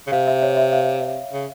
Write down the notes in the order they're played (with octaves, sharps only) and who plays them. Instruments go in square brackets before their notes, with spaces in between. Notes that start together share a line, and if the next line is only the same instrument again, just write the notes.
[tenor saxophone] C#3
[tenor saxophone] C3 [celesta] F5
[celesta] E5
C#5
E5
F5
[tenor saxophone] C#3